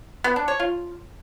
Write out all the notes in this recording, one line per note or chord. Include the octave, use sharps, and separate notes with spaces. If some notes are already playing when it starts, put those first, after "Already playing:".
B3
D4
C#5
F4